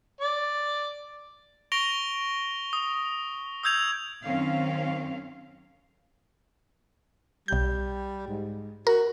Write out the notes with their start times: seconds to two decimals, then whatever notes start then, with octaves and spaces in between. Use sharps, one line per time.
0.21 D5
1.72 C#6 A#6 D7 F7 G7
2.73 D#6
3.63 D#6 E6 G6 G#6 F7
4.24 F#2 D#3 C4 C#4 F5
7.48 B1 G3 G6
8.27 G#2
8.87 F#4 A#4